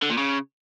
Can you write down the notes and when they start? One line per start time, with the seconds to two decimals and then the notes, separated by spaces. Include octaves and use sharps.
0.02 D3
0.10 A#2
0.17 C#3